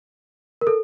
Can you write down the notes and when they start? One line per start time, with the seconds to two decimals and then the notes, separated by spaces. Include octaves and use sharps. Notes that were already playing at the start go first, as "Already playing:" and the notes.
0.61 A#4
0.67 A4